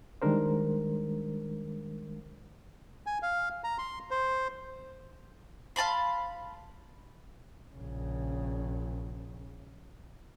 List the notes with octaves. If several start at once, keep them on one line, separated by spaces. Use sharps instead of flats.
D#3 G3 G#3 D4 A#4 C5
G#5
F5
A#5
C6
C5
F5 A5 B5 C6
A#1 C#3